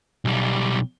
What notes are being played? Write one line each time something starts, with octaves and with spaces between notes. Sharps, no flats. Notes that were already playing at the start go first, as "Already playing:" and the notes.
B1 G3